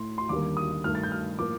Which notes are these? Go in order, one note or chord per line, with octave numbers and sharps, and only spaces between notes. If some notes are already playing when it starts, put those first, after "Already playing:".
Already playing: A2 A3 C6
C6
D#2 D3 G3 A#3 D6
D#6
G2 D#3 A3 F6
A6
G6
F6
A2 F3 A#3 D6